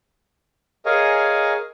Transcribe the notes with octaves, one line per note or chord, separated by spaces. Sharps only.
G#4 A#4 C#5 D#5 F5 G#5